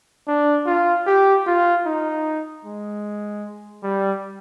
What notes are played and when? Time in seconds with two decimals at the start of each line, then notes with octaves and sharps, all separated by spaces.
0.28 D4
0.66 F4
1.07 G4
1.47 F4
1.86 D#4
2.65 G#3
3.83 G3